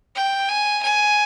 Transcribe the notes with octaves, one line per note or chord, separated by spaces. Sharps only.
G5
G#5
G#5